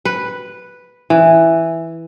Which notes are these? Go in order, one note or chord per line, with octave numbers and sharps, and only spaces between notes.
B4
E3